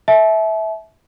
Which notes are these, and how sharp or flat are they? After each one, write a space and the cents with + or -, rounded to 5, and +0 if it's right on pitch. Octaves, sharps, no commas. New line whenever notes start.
E5 -15 A5 -40